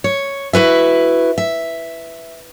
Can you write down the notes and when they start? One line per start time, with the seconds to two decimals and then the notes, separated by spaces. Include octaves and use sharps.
0.04 C#5
0.53 E4 F#4 B4 E5
1.38 E5